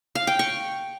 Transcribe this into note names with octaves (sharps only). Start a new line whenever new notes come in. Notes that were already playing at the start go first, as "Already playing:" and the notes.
F5
G5
C#6